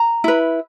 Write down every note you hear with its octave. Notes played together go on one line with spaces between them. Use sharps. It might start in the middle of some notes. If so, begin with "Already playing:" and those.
Already playing: A#5
E4 B4